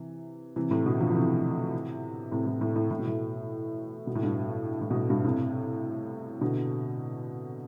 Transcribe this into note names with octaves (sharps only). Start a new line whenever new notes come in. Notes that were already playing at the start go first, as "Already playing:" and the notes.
Already playing: C3 E3
C3 E3
A2 C3
B2 D3
D3 F3
F3
C3 E3
A2 C3
A2
A2
A2
A2
B2
A2
B2
A2
G2 B2
A2
B2
A2
G2 B2
A2 C3
B2 D3